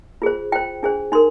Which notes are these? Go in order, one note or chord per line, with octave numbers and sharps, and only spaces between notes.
F4 G#4 C5
F4 C5 G5
D4 G#4 C5
D#4 A#4 C6